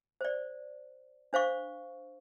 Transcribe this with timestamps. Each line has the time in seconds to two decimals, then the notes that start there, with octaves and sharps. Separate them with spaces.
0.21 C5 D5
1.33 D4 C5 F5 C#6